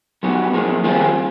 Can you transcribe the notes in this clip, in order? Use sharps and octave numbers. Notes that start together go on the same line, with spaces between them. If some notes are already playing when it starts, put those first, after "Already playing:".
F#3 B3 D#4 G4
F3 A#3 D#4 G#4
D#3 G3 C4 F4 G#4